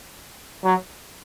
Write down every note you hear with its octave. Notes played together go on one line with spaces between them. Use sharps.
F#3